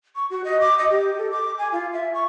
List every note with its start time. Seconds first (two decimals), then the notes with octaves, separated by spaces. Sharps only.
0.16 C#6
0.30 F#4
0.44 D#5
0.60 D6
0.78 D#5
0.90 G4
1.18 A4
1.31 D6
1.58 G#5
1.73 F4
1.93 E5
2.14 C#6